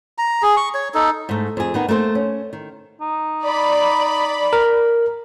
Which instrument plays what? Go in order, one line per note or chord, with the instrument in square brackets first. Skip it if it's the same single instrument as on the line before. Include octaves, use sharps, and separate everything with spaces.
[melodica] A#5
G#4
C#6
C#5
D#4 A4
[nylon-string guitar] G#2 A3
F2 G#4
D#3 B3 D#4
A3 A#3 A#4 C5
C#4
D#3
[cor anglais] D#4
[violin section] D5 B5
[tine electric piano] A#4